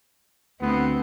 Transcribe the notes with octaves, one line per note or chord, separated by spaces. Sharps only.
D2 A3 B3 C4